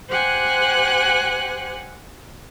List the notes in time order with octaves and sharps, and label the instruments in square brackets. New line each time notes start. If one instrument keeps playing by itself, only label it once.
[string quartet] G4 C5 F#5 G#5 F#6